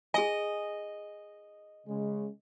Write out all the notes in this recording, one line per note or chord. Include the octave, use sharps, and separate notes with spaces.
G#4 D#5 G#5
C#3 G#3